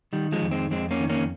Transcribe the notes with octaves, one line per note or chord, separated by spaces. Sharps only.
D#3 G3
F3 G#3
F2
G#3 C4
F2 G#3 C4
A#3 C#4
D#3
A#3 C#4